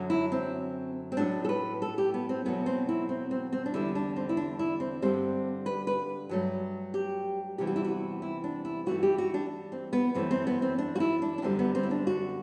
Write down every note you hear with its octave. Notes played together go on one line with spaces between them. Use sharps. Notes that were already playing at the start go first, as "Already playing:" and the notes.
Already playing: F#2 D3 F#3
E4
C4
C4
A2 F#3 A3 D4
A4
B4
A4
G4
B3
C4
E2 B2 F#3 A3 B3
C4
E4
C4
C4
C4
D4
E2 D3 G3 E4
D4
C4
E4
D4
E4
C4
G2 D3 G3 C4
B4
B4
G2 F#3 A3
G4
E2 C3 E3 G3 G4
F#4
E4
F#4
E4
D4
E4
G2 E3 A3 F#4
G4
F#4
D4
C4
B3
F#2 E3 A3 C4
C4
B3
C4
D4
F#4
E4
D4
D4
F#2 D3 G3 C4
B3
C4
E4
D4
F#4